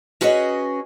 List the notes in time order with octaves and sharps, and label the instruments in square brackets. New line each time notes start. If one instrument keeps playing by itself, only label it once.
[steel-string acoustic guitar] C#4 F#4 G#4 B4 C#5 D#5